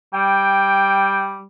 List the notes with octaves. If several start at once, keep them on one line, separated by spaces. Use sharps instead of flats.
G3 G5